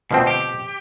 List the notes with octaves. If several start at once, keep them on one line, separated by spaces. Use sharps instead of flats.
D2 B2 F3 C4
G4